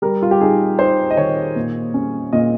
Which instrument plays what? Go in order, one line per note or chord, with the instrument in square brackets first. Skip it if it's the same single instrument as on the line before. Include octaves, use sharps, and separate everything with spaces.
[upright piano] G3 A#4
F4
G4
D#4 G#4
D#4 C5
D#5
D#3 C#5
A#2
C#4
A#2 D#5